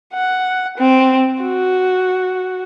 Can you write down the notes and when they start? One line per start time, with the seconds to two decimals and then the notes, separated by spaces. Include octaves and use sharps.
0.14 F#5
0.78 C4
1.42 F#4